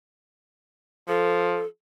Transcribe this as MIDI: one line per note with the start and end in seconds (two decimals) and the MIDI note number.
1.08 1.62 53
1.08 1.66 69